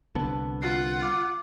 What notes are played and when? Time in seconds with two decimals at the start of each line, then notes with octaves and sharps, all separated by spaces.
0.15 C2 D3 B3 A5
0.62 F4 F#5 C7
1.02 D6